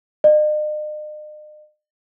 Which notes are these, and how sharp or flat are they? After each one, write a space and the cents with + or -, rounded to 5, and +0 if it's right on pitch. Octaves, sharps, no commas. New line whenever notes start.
D#5 -45